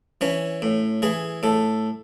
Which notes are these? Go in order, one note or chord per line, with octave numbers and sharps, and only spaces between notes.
E3 C#4
A2
E3 G#4
A2 A4